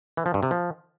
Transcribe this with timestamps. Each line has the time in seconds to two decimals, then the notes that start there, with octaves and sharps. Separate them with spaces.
0.17 E3
0.26 F3
0.34 G2
0.43 C3
0.51 F3